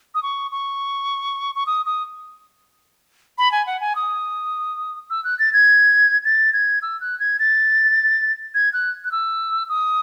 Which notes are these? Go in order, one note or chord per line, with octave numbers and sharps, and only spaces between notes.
D#6
C#6
C#6
C#6
D#6
D#6
B5
G#5
F#5
G#5
D#6
E6
F#6
A6
G#6
A6
G#6
E6
F#6
G#6
A6
G#6
F#6
F#6
E6
D#6